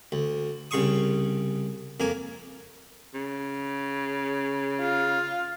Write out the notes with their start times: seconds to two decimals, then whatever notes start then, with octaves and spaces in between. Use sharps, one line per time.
0.12 D2
0.71 C2 C#3 C6 C#6 D#6
2.00 F2 A#3 G#5
3.14 C#3
4.80 F4